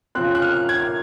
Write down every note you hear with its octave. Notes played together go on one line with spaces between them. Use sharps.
C#3 F3 C4 F#6
F#6
F6
G#6